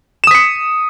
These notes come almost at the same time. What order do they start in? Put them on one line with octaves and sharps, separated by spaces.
E7 D#6 B6 C#7